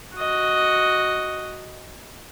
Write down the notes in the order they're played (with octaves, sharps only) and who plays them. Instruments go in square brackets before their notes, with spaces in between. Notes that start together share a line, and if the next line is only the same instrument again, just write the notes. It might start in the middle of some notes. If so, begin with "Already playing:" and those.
[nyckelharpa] F#4 D#5